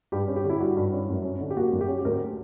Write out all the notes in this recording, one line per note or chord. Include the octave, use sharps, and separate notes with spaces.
G2 G4
C#4
G4
D3
E4
G3 F#4
G2
C#4
F#2
C#4
D3
G4
A#3 F#4
F#2
G4
C#4
G4
D2 A#4